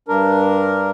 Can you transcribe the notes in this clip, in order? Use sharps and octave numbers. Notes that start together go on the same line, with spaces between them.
G2 D4 A#4